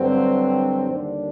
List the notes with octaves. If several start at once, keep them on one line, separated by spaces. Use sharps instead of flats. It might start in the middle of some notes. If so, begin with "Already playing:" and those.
Already playing: G2 D3 F#3 C4
D#2 D3 G3 D4